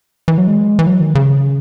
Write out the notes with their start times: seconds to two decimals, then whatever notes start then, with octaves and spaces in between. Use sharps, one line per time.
0.28 E3
0.38 F#3
0.47 G#3
0.79 E3
0.86 F#3
1.01 D#3
1.15 C#3